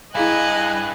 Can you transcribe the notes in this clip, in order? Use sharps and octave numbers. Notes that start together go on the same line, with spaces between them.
G2 E4 G#4 D#5 F5 G#5 F#6